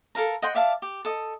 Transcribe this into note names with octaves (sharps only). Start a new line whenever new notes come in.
A4 A#4 F5 A#5
D#5 F#5 G5 C6
D5 E5 F5 A5
G4
A4 D#5